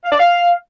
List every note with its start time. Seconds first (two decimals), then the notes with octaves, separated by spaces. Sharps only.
0.05 F5
0.12 D5
0.19 F5